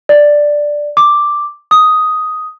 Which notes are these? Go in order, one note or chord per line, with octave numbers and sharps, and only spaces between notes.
D5
D6
D#6